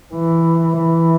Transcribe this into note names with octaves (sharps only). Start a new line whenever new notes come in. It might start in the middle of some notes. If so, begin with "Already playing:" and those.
E3
E3